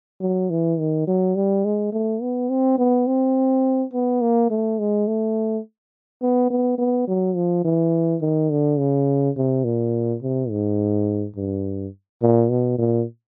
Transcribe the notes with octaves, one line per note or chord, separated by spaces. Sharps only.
F#3
E3
D#3
F#3
G3
G#3
A3
B3
C4
B3
C4
B3
A#3
A3
G#3
A3
B3
B3
B3
F#3
F3
E3
D#3
D3
C#3
C3
A#2
C3
G#2
G2
A#2
B2
A#2